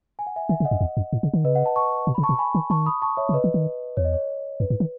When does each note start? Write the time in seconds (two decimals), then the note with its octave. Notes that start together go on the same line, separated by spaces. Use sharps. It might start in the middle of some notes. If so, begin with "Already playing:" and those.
0.19 G#5
0.27 F#5
0.36 E5 G#5
0.49 D#3 E5 G#5
0.60 C#3
0.65 D#5 F#5
0.71 F#2
0.81 E2
0.97 F#2
1.13 A2
1.23 C#3
1.34 D#3
1.44 C#3 B4 D#5
1.55 D#5 F#5
1.66 F#5 A5
1.76 A5 C#6
2.07 B2
2.15 C#3 B5
2.23 A5 C#6
2.29 B2
2.39 G#5 B5
2.55 D#3
2.70 D#3 A5 C#6
2.86 B5 D#6
3.02 A5 C#6
3.17 C#5 E5
3.29 D#3
3.33 C#3 B4 D#5
3.44 E3
3.54 D#3
3.97 E2 C#5
4.05 D#5
4.13 C#5
4.60 F#2 B4
4.70 G#2
4.80 D#3